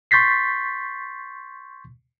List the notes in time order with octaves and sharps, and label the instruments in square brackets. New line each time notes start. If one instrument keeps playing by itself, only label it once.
[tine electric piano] C6 C#6 G6 A6 B6 C7